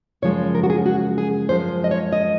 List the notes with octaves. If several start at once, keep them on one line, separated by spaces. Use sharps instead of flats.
F#2 C#3 F3 G#3 C#5
A#4
F#4
G#4
F#4
G#4
F#2 F3 G#3 C5
D#5
C#5
D#5